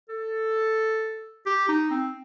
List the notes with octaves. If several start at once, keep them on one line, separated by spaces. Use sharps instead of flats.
A4
G4
D#4
C4